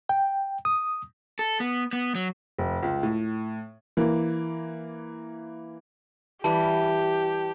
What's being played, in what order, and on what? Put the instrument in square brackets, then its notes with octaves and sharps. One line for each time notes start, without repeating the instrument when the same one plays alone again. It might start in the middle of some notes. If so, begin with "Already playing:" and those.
[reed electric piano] G5
D#6
[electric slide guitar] A4
B3
B3
F#3
[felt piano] F1
C#2
A2
[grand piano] E3 A#3
[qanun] E3 G3 [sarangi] G4 [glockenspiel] A5